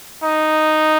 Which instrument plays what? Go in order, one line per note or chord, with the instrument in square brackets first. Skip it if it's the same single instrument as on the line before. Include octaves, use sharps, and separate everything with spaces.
[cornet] D#4